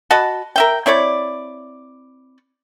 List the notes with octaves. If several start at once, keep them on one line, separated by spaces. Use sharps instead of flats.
F#4 D#5 A5 B5
A#4 E5 G5
C4 E4 C#5 D5